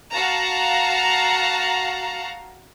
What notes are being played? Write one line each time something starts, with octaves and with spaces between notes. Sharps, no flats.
F#4 F5 A5 A#5